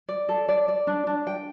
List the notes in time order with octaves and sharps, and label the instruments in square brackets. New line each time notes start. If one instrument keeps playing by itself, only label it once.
[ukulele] D5
A4
D5
D5
D4
D4
G5